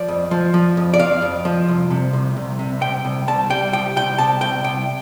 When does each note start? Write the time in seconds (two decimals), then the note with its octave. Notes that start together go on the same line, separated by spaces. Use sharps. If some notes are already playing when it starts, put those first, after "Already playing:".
Already playing: F3 D5
0.08 F2
0.31 F3
0.54 F3
0.77 F2
0.94 D5
1.00 F2 F5
1.22 F2
1.45 F3
1.68 C2
1.90 C3
2.13 C2
2.37 C2
2.59 C3
2.82 C2 G5
3.05 C2
3.28 C2 A5
3.50 G3 G5
3.73 C2 G5
3.96 C2 G5
4.18 C2 A5
4.41 C2 G5
4.64 C2 G5